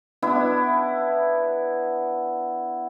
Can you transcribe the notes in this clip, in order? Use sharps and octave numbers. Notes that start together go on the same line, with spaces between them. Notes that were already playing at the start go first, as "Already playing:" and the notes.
B3 D4 E4